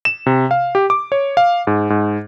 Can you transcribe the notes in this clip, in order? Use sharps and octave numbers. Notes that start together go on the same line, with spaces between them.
E7
C3
F5
G4
D6
C#5
F5
G#2
G#2